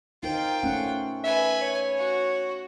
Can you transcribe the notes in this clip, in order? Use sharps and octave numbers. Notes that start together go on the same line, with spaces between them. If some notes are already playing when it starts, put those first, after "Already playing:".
D#4 F4 A#4 C5 G5
A3 C#4 F#5
B4 E5 G#5
C#5
F#4